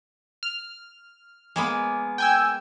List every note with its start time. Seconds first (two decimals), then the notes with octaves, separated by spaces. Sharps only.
0.43 F6
1.56 G#3 A#3 B3
2.18 G5 G#5 E6